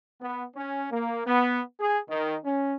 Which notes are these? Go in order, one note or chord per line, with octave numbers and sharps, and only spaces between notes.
B3
C#4
A#3
B3
G#4
D#3
C#4